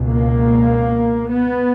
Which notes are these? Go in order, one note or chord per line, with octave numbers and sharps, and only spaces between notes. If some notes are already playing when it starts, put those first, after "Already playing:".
Already playing: C#2 B2
A#3
B3